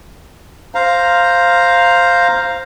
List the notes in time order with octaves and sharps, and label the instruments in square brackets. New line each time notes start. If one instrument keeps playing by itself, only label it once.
[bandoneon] C5 F5 A#5